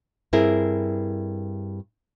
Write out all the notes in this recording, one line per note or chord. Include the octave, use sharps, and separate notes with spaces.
G2 C4 E4 G#4 A#4